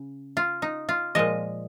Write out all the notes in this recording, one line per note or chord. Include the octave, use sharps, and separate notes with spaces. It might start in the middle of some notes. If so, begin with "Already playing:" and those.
Already playing: C#3
F4
D#4
F4
A#2 F3 G#3 D#5